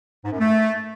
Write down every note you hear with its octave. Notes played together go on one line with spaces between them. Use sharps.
G#2
F#2
A3